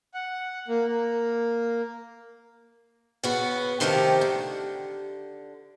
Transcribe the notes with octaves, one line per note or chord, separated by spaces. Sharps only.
F#5
A#3
A#3
C#3 B3 F#4
C3 D#3 F3 A3 G4 A#4
D3